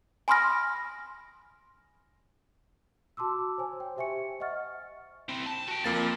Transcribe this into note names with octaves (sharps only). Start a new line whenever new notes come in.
G#5 B5 C6 D#6 F6 A#6
F#4 A5 C6 D6 E6
C5 C#5 G#5
G5
G4 C5 E5 G#5 C#6 C#7
D#5 E5 F#5 C#6 F6 A6
C4 E4
A5
F#4 G5
F2 F3 A#3 A6